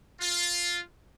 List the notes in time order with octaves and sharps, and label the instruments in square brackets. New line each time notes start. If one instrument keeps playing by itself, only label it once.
[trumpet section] F4